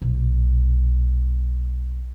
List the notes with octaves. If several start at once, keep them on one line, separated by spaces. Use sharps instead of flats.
B1 A#2